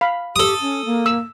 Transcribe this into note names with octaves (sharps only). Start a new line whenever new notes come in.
F5 B5
G4 A4 D#6
C#4
A#3
E6